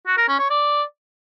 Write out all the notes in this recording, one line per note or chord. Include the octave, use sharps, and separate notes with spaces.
F#4
A#4
C#4
C#5
D5